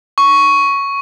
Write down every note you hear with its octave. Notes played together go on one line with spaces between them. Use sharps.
C#6